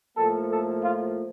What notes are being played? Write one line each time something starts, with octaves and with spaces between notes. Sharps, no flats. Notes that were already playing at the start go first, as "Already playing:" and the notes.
A2 F3 A#3 A4
A4
F4